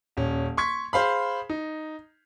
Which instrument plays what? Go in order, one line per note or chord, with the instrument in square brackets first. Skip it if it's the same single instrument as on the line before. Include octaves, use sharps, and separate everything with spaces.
[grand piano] D#1 C#4
C6 C#6 G#6 B6
G#4 C5 F5 B5
D#4